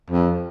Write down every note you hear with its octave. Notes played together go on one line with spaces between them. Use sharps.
F2